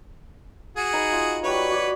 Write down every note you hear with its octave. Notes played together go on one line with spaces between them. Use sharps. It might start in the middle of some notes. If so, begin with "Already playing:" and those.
F#4 G#4
D#4 B4
F4
G3 F#4 B4 C#5
F#4 D5